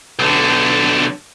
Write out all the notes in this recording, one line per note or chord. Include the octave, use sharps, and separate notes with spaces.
B1 D3